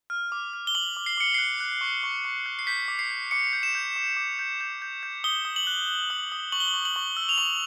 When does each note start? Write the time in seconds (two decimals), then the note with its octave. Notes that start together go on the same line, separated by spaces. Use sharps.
0.10 F6
0.32 D6
0.53 F6
0.67 G7
0.75 D6 F#7
0.97 D6
1.06 C7
1.17 D6 C#7
1.34 F#6 C7
1.60 F#6
1.81 C#6
2.03 C#6
2.25 C#6
2.46 F#6
2.59 C7
2.67 G6 B6
2.88 D6
2.99 C7
3.10 G6
3.31 D6 C#7
3.53 G6
3.63 E7
3.75 G6
3.96 D6
4.17 D6
4.39 G6
4.61 G6
4.82 G6
5.03 G6
5.24 D#6 G7
5.45 D#6
5.56 F#7
5.67 F#6
5.88 F#6
6.10 D#6
6.32 D#6
6.52 C#6 F#7
6.60 G7
6.68 F#7
6.74 C#6
6.85 F#7
6.96 C#6
7.17 E6
7.29 F7
7.38 C#6 F#7